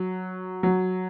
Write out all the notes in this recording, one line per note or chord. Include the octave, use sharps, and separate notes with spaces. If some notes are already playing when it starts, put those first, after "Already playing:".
Already playing: F#3
F#3